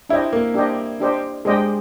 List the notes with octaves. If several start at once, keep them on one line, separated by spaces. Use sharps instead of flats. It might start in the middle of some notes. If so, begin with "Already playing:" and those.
D4 E4 G4 C5 D#5 G5
A#3
D4 G4 C5 D#5 G5
D4 G4 C5 D#5 G5
G#3 D4 G4 C5 D#5 G5